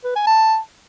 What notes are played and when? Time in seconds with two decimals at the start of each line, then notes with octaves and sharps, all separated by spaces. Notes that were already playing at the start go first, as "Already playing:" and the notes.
0.04 B4
0.15 G#5
0.27 A5